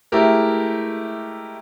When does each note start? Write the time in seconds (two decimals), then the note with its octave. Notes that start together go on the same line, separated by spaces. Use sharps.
0.12 G#3 A3 E4 G4 A#4